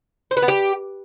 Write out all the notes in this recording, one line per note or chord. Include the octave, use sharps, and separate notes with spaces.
C5
B4
B3
G4